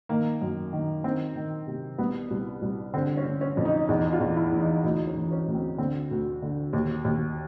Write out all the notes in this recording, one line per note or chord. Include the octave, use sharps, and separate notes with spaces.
D#3 A#3
F#2
D#3
D#3 C4
D#3
C3
C2 B3
C2
C2
D3 C4
C#4
D3
C#4
F2
D#4
E2 D#4
F4
E2
E4
E3
D#4
D2 D#4
C#4
E3
C#4
D2
C4
D3 C4
D2
D3
D#2
D#2